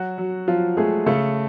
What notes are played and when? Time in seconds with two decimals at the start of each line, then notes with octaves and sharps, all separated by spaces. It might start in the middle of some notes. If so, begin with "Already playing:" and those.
Already playing: F#3 F#4
0.18 F#3
0.48 F3 F#3 F4
0.77 G#3 A3 G#4
1.06 C#3 A3 A4